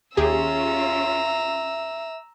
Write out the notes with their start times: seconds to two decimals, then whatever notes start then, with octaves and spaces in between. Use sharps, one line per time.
0.17 D#2 C#4 F4 G4 G#4 E5 A#5 E6